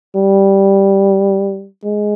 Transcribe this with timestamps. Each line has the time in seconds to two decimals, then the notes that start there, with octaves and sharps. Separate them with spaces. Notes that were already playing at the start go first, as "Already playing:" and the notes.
0.15 G3
1.84 G#3